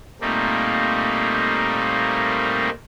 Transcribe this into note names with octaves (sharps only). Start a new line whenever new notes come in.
A#2 G3 A3 A#3 C4 D#4